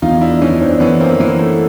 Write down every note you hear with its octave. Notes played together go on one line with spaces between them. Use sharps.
E2 D#4 F4
D4 E4
E3 C#4 D#4
C4 D4
E3 B3 C#4
A#3 C4
E3 A#3
A3